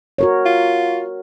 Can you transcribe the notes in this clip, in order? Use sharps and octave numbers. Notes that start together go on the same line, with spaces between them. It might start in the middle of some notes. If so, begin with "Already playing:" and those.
F#4 A#4 C#5
F4